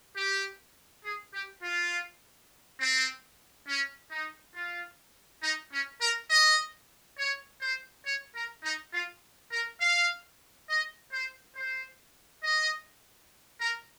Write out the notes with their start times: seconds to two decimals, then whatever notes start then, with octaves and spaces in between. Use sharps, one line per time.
0.17 G4
1.04 G#4
1.34 G4
1.63 F4
2.80 C4
3.67 C#4
4.11 D#4
4.55 F4
5.43 D#4
5.72 C#4
6.01 A#4
6.30 D#5
7.18 C#5
7.61 C5
8.06 C#5
8.34 A#4
8.63 D#4
8.94 F4
9.52 A#4
9.81 F5
10.68 D#5
11.12 C5
11.56 C5
12.44 D#5
13.61 A#4